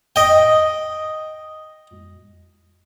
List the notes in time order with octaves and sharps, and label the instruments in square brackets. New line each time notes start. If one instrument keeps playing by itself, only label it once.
[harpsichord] D#5 G5